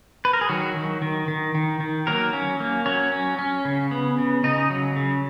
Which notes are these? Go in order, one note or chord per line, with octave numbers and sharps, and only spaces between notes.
B4
A#4
G#4
D#3 F#3 F#4
D#3
D#3
D#3
D#3
D#3
F#3 A#3 A#4
C#4
A#3
F#3 C#4 C#5
C#4
C#4
C#3
B3
C#3
C#3 D#4 D#5
F#3
C#3